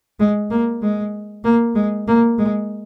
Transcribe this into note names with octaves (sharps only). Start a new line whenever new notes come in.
G#3
A#3
G#3
A#3
G#3
A#3
G#3